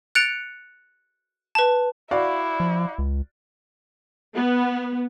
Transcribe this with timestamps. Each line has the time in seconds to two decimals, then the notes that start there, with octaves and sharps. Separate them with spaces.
0.15 F#6 A6 C#7 D7 F7
1.55 B4 A5
2.11 E4 F#4 D5 F5
2.60 F3
2.98 C#2
4.35 B3